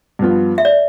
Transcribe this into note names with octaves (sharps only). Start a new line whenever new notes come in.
G2 F3 B3 F4
E5
D5